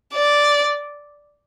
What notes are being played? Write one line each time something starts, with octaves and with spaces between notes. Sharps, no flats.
D5